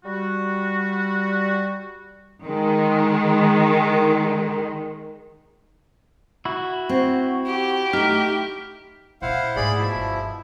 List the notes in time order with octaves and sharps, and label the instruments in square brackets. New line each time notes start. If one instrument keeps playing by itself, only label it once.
[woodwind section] G3 F#4
[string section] D#3 G#3
[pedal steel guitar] E4 F#4
[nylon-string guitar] C4
[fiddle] G4
[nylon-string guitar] A3 D#4 [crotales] F6 B6
[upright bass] A#2 C#4 [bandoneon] E4 C5 F#5 [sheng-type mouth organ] F5
[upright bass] G#2 A3 [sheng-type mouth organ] G#4 D5 B5
[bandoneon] B2 F3 E4 [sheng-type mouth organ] E5
[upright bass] G1